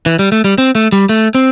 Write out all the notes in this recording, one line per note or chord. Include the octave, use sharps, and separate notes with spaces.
E3
G3
A3
G3
C4
A3
G3
A3
C4